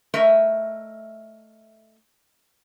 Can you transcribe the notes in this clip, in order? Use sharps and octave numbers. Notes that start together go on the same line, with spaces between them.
A3 A#4 D#5 E5